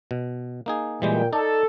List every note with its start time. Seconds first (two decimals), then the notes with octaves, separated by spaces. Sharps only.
0.11 B2
0.66 A#3 D#4 G#4
1.02 A#2 E3 G3 G#3 G5
1.33 D#4 A4 D5